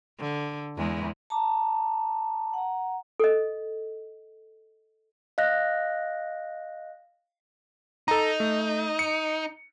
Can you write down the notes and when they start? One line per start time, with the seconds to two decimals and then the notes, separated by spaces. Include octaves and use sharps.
0.19 D3
0.77 E2 G#3
1.30 A5 A#5 D6
2.54 F#5 A#5
3.20 A4 D#5
5.38 D#5 F5 F#6 A#6
8.08 D#4 A4 A#5
8.40 A3
8.99 C#7